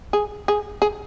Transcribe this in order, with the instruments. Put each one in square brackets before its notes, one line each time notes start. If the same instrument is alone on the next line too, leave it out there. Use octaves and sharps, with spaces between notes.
[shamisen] G#4
G#4
G#4